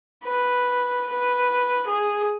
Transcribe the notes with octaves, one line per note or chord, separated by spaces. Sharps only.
B4
B4
G#4